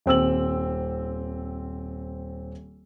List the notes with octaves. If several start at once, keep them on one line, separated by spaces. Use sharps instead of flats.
D#1 C4 E6 F#7